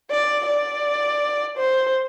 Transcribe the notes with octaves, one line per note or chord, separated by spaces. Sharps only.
D5
D5
C5